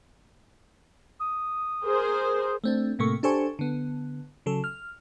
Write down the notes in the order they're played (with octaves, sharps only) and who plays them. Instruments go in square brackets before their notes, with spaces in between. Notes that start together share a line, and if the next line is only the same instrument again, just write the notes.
[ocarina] D#6
[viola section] G#4 A#4 C5
[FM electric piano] A3 C4 D4
A2 C3 A3 A#3 C#6
D4 G4 A4 C5 G#5 C#6
D3 B3
C#3 F#3 A4
F6